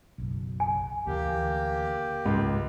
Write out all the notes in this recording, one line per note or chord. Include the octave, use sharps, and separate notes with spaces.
F#1 B1
G#5
D2 D3 E3 A#3 G4
C#2 G#2